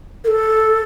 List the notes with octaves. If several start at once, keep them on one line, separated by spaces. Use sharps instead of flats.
A#4
A4